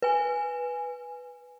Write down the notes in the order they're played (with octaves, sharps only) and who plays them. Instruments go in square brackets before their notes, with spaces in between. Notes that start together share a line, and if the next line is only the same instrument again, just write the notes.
[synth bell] B4 G#5